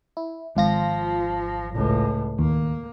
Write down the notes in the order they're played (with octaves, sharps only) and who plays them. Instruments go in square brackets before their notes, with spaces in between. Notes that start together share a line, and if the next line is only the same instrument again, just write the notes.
[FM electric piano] E4
[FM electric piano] G#1 F4 A#6 [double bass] F3
[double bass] C#2 A2
[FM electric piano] D#2 [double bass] A#3